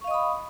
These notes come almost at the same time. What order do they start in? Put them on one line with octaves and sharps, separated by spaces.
C#6 F5 D#5 D#6 B5